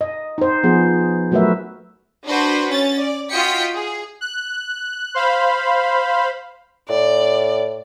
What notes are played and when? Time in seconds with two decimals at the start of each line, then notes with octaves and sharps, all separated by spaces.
0.01 D#5
0.38 D#4 C5
0.63 F3 B3 G#4
1.31 F#3 A3 F#4 A#4 B4 E5
2.25 D4 F#4 B4 C5
2.68 C#4 A6
2.98 D5
3.31 F4 F#4 D#5 G5 B6 C#7
3.74 G#4
4.21 F#6
5.15 C5 F5 B5
6.89 A2 D5